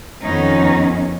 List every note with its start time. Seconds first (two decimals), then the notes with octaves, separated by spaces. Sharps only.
0.23 F2 D#3 B3 C#4 D#4